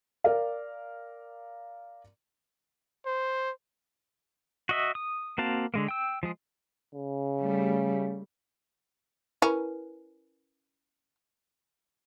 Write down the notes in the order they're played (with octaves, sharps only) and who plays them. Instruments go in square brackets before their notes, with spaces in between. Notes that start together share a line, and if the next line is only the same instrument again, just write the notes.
[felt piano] A#4 D5 F5
[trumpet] C5
[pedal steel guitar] F#4 D#5 E5
D#6
A#3 C4 F#4 F5 A5
D3 G#3 A#3
G5 E6
F3 G#3 G#4
[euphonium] C#3
[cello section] G3 A3
[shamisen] C#4 [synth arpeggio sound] E4 A#4 B4